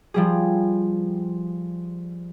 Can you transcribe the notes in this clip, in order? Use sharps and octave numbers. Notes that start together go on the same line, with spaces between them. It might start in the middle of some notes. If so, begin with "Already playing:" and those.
F3 G3 G#4